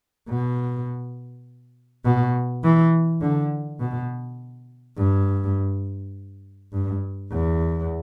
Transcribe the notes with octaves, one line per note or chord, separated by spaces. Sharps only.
B2
B2
E3
D3
B2
G2
G2
E2